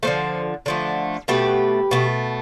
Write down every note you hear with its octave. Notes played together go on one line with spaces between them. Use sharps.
D3 F3 A3 A4 C5
D3 F3 A3
B2 A3 G4 B4
B2 A3